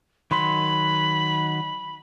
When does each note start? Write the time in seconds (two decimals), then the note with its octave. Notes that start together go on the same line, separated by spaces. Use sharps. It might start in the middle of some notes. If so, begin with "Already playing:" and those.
0.31 D#3 F#3 B5 C6